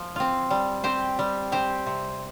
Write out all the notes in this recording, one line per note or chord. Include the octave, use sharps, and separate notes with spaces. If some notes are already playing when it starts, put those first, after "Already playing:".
Already playing: F3
C4 F4
G3
C4 G4 C5
G3
C4 G4 C5
C3